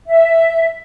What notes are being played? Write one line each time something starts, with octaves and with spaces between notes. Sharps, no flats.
E5